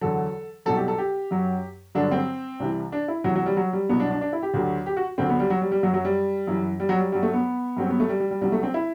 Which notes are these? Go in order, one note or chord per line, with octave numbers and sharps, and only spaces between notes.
E2 D3 F#3 A4
C2 B2 F#3 A4
G4
A4
G4
F#2 F#3
G2 D3 F#3 D4
C4
C2 C3 E3
D4
E4
E2 C3 E3 F#3
F#3
G3
F#3
G3
C2 B2 F#3 B3
D4
D4
D4
E4
G4
D2 D3 F#3
G4
F#4
D2 D3 F#3 C4
B3
G3
F#3
G3
G3
F#2 F#3
F#3
G3
F#2 E3
G3
F#3
G3
G2 F#3 G3
A3
B3
G2 F#3 C4
B3
A3
G3
G3
G3
C2 C3 F#3 G3
A3
C4
E4